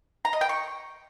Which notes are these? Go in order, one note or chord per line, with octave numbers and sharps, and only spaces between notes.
A#5
D#5
G5
C#6